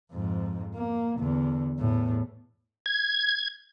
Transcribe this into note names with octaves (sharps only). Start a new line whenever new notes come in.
F2 G#2
A#3
E2 D3
E2 A2
G#6